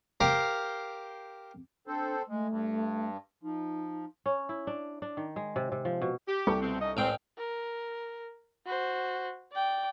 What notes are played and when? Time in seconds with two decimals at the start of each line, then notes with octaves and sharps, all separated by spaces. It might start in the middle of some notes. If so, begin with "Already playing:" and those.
0.20 G4 A#4 C5 F5 G5
1.87 C4 D4 A4 C5
2.29 G#3 A3
2.49 G2
3.43 F3 D#4
4.26 C#4
4.49 E4
4.67 D4
5.02 D4
5.17 D#3
5.36 G#3
5.56 C3
5.72 C3
5.85 F3
6.02 B2
6.27 G4
6.47 C2 A4 C#6
6.62 B2 A3 C4
6.80 C#4 D#4 D#5
6.97 A1 C4 G5
7.38 A#4
8.66 F#4 C5
9.52 D5 G5